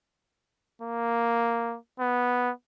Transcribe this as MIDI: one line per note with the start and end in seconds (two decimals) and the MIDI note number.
0.82 1.77 58
2.00 2.51 59